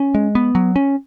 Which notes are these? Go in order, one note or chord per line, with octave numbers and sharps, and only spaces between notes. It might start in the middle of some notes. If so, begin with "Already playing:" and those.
Already playing: C#4
G#3
B3
F#3
C#4